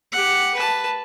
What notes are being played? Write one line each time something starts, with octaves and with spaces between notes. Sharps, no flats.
G4 F#5
B4 A5